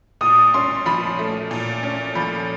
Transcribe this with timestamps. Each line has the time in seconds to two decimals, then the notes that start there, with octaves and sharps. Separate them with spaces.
0.21 A#2 D#6
0.54 C#4 C6
0.86 F3 B5
1.19 A3
1.51 A#2
1.83 C#4
2.15 F3 B5